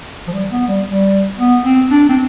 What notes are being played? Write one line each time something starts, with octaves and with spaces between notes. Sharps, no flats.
F3
G3
B3
G3
G3
B3
C4
D4
C4